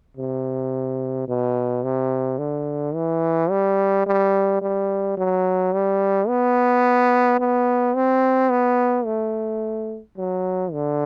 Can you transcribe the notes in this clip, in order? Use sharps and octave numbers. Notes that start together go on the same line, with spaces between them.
C3
B2
C3
D3
E3
G3
G3
G3
F#3
G3
B3
B3
C4
B3
A3
F#3
D3